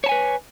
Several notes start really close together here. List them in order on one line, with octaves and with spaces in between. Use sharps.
C#5 A5 G#5 B4